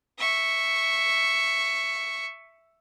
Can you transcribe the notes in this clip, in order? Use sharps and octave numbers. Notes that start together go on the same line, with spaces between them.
E5 C#6